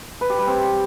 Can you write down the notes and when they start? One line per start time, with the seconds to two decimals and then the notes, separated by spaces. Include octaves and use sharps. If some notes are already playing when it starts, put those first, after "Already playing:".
0.21 B4
0.30 G4
0.39 G3
0.47 C4